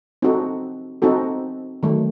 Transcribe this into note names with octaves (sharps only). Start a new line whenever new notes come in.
C4 D#4 F#4 A4
C4 D#4 F#4 A4
D#3 F#3 A3